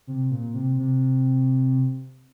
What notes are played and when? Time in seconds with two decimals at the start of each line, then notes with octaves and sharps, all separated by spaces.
0.07 C3
0.31 A#2
0.54 C3
0.78 C3